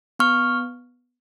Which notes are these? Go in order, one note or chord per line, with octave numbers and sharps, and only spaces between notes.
B3 C#6 F6